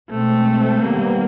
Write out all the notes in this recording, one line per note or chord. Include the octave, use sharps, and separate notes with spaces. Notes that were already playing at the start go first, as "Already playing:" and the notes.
B2 G#3 A3 C4
C3 D#3 G3 A#3 B3